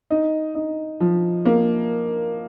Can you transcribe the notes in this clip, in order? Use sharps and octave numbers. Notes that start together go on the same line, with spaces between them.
D#4
D#4
F3
A#3